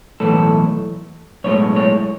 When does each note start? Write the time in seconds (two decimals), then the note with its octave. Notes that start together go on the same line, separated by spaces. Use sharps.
0.20 B1 A2 E3 A4
1.44 B1 A2 G#3 C#5
1.76 C#5